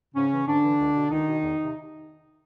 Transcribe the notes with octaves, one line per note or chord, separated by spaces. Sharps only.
G#2 C#3 C#4
E3
G#2 D3 D4
E3
C#2
B2
C#2 D#3 D#4
B2
E2
C3 D#3